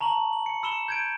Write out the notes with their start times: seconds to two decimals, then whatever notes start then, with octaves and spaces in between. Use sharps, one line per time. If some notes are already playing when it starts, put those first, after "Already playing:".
0.01 A5 A#5 C#6 F#7
0.13 A5
0.33 F#7
0.46 C#7
0.63 B5 E6 C#7 E7 G7
0.88 G6 G#6 D7